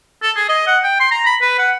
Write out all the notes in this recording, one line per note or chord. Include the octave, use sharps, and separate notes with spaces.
A4
G#4
D#5
F#5
G5
C6
A#5
B5
B4
F#5